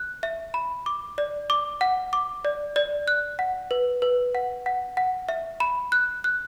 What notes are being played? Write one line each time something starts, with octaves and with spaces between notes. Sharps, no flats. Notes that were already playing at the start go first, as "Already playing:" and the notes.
Already playing: F#6
E5
B5
D6
D5
D6
F#5
D6
D5
D5
F#6
F#5
B4
B4
F#5
F#5
F#5
E5
B5
F#6
F#6